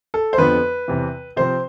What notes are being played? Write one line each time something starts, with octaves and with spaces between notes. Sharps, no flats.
A4
C5
F2 D3 F3 B3 B4
E2 C3 E3
C3 F3 C4 C5